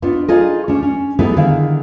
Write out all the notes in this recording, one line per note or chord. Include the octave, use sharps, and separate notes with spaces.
B3 D4 D#4 F4
D#4 F4 G#4 A4 D5 D#5
C#4 D4
C#4
G3 B3 D#4 E4 G#4 A4
D3 D#3 E4 G#4 F5